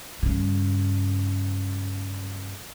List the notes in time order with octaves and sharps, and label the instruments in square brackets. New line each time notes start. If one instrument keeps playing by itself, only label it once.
[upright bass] G2 C#3